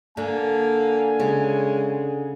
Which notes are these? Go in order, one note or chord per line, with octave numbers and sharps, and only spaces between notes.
D3 A#3 G#5
C#3 G#3